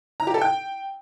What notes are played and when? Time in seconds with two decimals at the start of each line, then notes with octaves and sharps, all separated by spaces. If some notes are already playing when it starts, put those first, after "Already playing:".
0.20 A#5
0.27 G4
0.34 A4
0.41 G5